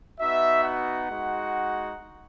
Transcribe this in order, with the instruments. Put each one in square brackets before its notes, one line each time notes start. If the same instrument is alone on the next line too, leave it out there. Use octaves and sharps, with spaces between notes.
[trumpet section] B3 D#4 F#4 E5
F#5
G#3 D#4 F#4